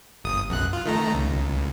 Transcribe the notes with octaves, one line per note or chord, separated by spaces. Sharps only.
G1 D#6
B1 F#2 F#6
F4
D#3 A3 A#5
C#2